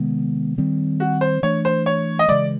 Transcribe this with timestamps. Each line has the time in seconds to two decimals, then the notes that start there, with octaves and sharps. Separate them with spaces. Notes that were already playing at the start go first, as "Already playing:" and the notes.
Already playing: C3 D#3 G#3 B3
0.58 D#3 G3 C4
1.00 F#4
1.21 C5
1.43 E3 A3 D4 C#5
1.65 C5
1.86 C#5
2.19 D#5
2.28 C#3 E3 G#3 D5